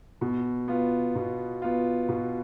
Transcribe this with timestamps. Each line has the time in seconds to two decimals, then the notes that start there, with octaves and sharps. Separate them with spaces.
0.21 B2
0.68 B3 F4
1.15 B2
1.62 B3 F4
2.09 B2